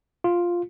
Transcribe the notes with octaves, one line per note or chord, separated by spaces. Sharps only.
F4